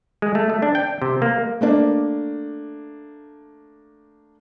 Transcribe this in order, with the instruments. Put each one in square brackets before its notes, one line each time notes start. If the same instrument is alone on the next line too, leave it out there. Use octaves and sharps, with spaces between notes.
[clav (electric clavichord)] G#3
A3
A3
D4
G5
C3
A#3
[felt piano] A3 A#3 D4